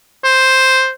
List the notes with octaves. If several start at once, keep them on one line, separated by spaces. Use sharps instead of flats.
C5